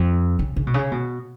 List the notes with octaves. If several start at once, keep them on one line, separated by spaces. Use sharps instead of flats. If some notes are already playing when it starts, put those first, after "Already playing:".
Already playing: F2
C#3
C#3
B2
C#3
B2